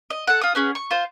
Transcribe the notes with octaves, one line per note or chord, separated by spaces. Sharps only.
D#5
A4 F#5
F4 D#6
B3 C#4 G#4
C#6
F4 C5